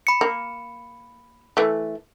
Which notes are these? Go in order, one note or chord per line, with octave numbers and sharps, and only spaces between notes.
B5 C#7
A#3
E3 A3